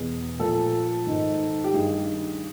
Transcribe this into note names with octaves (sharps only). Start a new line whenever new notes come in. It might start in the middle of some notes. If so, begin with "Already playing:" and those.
Already playing: E2 B2 G#4
A#2 F3 A4
G#2 D#3
G4
G2 D#3 G#4